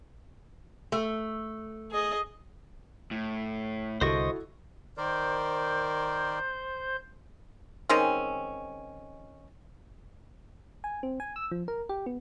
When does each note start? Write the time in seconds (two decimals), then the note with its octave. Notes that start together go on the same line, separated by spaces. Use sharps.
0.92 A3
1.92 G#4 D#5
3.11 A2
4.01 C2 D3 E4 F#4 A4 C5 D#5 C#6
4.97 D#3 A#4 C5 D5 G6
7.89 D#3 G#3 C4 C#4
10.84 G#5
11.03 C4
11.20 G#5
11.36 E6
11.52 F3
11.68 A#4
11.89 G4
12.06 B3